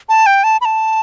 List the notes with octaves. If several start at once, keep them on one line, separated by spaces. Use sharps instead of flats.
A5
G5
A5
B5
A5